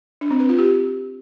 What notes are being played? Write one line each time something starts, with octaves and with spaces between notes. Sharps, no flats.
D4
C4
B4
F4
G4